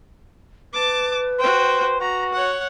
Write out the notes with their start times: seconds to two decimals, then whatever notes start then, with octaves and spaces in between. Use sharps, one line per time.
0.73 B4 A5 D6
1.39 F#4 C5 G5
2.01 F#4 A#5
2.32 C#5 F#5